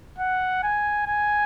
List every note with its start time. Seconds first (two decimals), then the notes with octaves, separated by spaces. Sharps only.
0.18 F#5
0.63 G#5
1.07 G#5